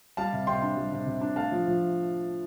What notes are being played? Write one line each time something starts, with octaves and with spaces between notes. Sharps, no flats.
G3 F5 A5
C3
C3 G5 C6
D4
G3
C3
C3
D4
A3 F5 A5
F3
F3